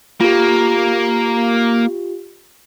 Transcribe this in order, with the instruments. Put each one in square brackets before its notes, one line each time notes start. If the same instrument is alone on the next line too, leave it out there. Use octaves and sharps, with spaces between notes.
[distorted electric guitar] A#3 [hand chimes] F4 G4